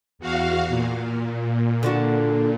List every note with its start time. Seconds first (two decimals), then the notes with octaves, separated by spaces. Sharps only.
0.19 E2 F#4 F5
0.68 A#2
1.83 D3 D4 F#4